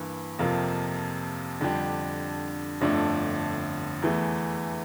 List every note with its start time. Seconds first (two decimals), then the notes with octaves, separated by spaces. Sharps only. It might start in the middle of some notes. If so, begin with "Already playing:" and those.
Already playing: G2 E3 A#3
0.39 F2 C3 F3 A#3 F4
1.60 F2 D3 G3 D4 G4
2.81 G1 F2 D3 A3 D4
4.02 E2 E3 A3